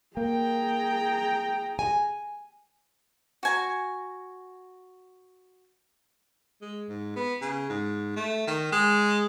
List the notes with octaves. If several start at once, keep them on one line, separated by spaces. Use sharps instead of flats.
A#3 G#4 G5 A#5
G#5
F#4 G#5 A#5
G#3
G#2
B3
C#3
G#2
A3
D#3
G#3